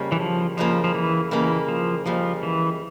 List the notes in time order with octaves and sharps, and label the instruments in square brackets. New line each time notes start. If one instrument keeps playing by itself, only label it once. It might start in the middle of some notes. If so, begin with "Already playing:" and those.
Already playing: [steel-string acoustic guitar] F2 C#3 G3 A#3
[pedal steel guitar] E3
F3
[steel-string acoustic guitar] F2 C#3 G3 A#3 [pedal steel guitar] F3
[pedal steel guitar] F3
E3
[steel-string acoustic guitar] F2 C#3 G3 A#3 [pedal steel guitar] E3
[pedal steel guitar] F3
[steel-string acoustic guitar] F2 C#3 G3 A#3 [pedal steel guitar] F3
[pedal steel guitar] E3